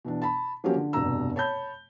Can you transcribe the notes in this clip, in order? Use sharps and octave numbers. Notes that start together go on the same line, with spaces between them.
B2 E3 D4
A5 B5
F3 F#3 A#3 C#4 G4
D3
F1 G2 B2 A#5 E6
C#5 A5 B5 G6